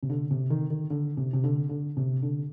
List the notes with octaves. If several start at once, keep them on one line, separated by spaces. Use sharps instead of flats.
C3
D3
C3
D#3
D#3
D3
C3
C3
D3
D3
C3
D3